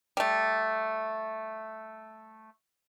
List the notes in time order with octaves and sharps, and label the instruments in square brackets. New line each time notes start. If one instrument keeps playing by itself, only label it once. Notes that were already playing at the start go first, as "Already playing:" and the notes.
[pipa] G3 A3